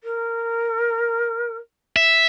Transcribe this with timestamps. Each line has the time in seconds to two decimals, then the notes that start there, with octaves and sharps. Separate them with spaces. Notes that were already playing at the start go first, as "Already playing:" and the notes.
0.03 A#4
1.96 E5